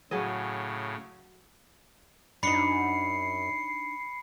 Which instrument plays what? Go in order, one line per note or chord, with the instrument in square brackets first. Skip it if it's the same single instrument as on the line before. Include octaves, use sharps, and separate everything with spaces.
[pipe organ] A2 C#3 [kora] F#3 G#4 D#5
[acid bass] F#2 [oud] D4 D#4 [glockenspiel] B5 C#7 [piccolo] C7